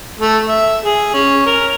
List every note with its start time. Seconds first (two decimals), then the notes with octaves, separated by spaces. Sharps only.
0.19 A3
0.49 E5
0.85 G#4
1.15 C#4
1.46 A#4